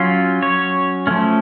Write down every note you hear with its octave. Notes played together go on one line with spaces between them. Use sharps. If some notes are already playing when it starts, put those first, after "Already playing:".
Already playing: F#3 C#4 F4
C#5
F3 A3 C#4